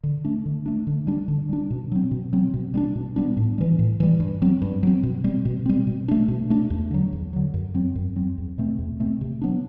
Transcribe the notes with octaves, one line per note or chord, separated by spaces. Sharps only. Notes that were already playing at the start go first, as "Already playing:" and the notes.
D3
A3 D4
D3
A3 D4
D3
G3 D4
D3
G3 D4
B2
F#3 C4
B2
F#3 C4
B2
G3 B3 D4
B2
G3 B3 D4
A2
E3 G3
A2
E3 G3
G2
F#3 C4
G2
F#3 C4
B2
G3 C4
B2
G3 C4
B2
A3 D4
B2
A3 D4
E2
D3 F#3
E2
D3 F#3
F#2
F#3 C4
F#2
F#3 C4
E2
B2 A3 C4
E2
B2 A3 C4
C3
F#3 B3 D4